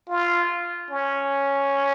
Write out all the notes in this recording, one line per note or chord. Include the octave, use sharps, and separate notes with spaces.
F4
C#4